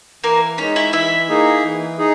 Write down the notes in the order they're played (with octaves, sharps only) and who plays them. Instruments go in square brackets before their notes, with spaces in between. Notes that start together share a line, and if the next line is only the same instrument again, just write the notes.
[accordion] E3 [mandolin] A#3 A#4
[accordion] G#3 D#4 [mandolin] C#4 C#5
[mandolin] E4 E5
[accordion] E3 [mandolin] E4 E5
[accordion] A#3 D#4 G#4
E3
D#4 G#4